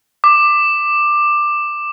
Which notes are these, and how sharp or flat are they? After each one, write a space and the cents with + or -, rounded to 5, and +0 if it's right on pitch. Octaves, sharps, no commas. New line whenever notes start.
D6 +15